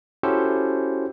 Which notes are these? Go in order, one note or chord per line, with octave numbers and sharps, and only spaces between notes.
C#4 E4 F#4 G4 A4 C5